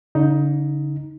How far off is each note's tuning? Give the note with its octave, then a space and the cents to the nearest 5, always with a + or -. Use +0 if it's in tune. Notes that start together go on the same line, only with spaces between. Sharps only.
D3 -40 D#4 +15